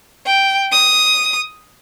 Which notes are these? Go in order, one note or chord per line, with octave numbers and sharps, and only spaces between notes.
G5
D#6